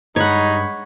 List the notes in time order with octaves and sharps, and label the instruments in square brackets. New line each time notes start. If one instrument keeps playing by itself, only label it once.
[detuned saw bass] G2 [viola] G#3 B5 [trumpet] D#4 [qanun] C#5 F#5